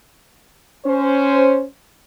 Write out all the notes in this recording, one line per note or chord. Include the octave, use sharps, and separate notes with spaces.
C#4 C5